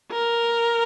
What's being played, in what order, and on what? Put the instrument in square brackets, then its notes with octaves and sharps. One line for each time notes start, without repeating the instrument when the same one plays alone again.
[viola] A#4